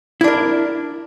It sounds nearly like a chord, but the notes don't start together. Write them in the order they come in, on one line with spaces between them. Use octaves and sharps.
E4 D4 A#4